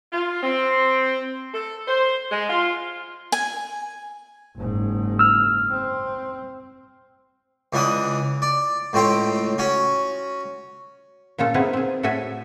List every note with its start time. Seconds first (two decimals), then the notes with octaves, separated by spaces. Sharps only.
0.13 F4
0.42 C4
1.54 A4
1.87 C5
2.31 G#3
2.49 F4
3.32 G#5
4.57 F#1 G#2
5.19 E6 F6
5.71 C4
7.73 C#2 E3 D4 F#5 D#6
8.42 D5
8.93 C#2 A2 C4 C5 G5
9.58 C#4 F#4 C#5
11.38 A#2 C#4 F4 A4
11.54 B3 C4 D#4 E4 G#4
11.73 C4 G#4
12.03 A2 F#4 A4 E5 G#5